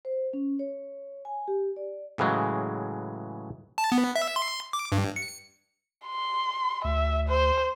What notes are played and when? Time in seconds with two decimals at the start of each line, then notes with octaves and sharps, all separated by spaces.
0.05 C5
0.33 C#4
0.59 C#5
1.25 G#5
1.48 G4
1.77 D5
2.18 A2 C#3 E3 F#3 G#3
3.78 A5
3.92 B3
4.16 E5
4.36 C6
4.73 D6
4.92 G2
5.16 C#7
6.06 C6
6.84 D2 E5
7.29 C5